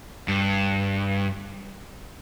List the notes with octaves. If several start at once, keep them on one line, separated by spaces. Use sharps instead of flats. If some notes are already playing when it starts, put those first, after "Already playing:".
G2